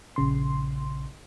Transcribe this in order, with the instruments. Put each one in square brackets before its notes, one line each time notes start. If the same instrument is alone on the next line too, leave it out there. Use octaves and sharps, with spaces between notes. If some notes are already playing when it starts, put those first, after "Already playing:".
[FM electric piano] A#1 C#3 C6